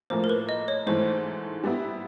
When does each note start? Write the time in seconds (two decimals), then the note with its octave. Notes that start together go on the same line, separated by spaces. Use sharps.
0.10 A2 F3 A#3 C5
0.24 A#4
0.29 B4
0.49 D#5
0.68 C#5
0.87 G#2 E3 A3 C5
1.64 G3 B3 E4